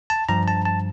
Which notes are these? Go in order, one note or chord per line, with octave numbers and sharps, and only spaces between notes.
A5
G2 F3 A#5
A5
A5